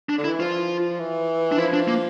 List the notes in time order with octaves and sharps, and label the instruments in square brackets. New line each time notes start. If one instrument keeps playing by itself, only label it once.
[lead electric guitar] D4
[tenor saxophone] D3
[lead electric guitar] E4
[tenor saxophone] E3
[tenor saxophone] F3 [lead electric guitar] F4
[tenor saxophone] E3
[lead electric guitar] D4
[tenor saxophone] F3 [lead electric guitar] E4
[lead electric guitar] D4
A#3